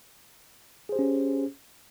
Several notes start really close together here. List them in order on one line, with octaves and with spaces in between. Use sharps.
G#4 C5 G4 C#4